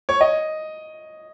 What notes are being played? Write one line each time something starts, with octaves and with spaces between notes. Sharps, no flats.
C#5
D#5